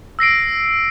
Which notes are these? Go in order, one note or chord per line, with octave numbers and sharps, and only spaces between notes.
E6 A#6 C7 D7